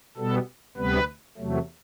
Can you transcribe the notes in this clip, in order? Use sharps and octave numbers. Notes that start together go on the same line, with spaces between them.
B2 G3 B3 A4
D2 C3 G3 B3 B4
E2 C3 F#3 A3